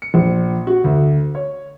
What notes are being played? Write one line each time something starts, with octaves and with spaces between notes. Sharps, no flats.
C#7
A#1
F#4
D2
C#5